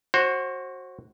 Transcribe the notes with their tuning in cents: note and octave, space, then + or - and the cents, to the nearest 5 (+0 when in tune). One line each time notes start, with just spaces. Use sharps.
F#4 +0 C5 +30